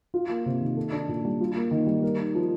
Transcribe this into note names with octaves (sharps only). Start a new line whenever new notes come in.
F4
A#3
C3
D#3
A4
D4
A#2
G3
F4
A#3
D#3
G3
A#4
D#4
F3